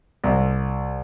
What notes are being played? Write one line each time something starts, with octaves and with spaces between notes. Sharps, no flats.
C2